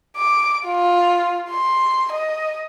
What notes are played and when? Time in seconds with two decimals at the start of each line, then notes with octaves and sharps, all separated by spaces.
0.17 D6
0.66 F4
1.50 C6
2.12 D#5